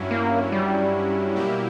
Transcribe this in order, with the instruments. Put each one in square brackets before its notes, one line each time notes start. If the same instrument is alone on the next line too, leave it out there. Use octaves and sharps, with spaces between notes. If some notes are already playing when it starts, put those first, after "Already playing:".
Already playing: [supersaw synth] G2 F#3 C#4 E4
[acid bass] A#3
G3
[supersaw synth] B2 A#3 E4 G4